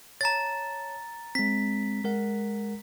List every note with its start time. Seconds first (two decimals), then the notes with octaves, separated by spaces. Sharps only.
0.21 C#5 A5 A#5 A6
1.35 G#3 C4 B6
2.04 G#3 A#4 F#5